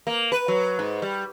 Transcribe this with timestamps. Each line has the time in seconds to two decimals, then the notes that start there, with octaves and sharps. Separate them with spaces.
0.07 A#3
0.32 B4
0.48 F#3
0.79 G#2
1.02 G3